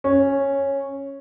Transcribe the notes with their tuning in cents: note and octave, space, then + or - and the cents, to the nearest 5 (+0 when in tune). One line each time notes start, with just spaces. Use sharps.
C#4 -10